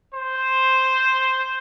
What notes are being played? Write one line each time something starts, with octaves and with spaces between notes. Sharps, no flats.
C5